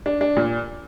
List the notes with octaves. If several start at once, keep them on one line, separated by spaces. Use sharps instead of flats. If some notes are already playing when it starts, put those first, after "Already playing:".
D4
D4
A#2